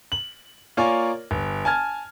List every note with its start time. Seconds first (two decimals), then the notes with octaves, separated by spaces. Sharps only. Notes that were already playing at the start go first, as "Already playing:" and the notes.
0.12 F#7
0.77 A#3 F4 A#4 C#5 D5 G#5
1.31 G1
1.65 G#5 A5 F6 G#6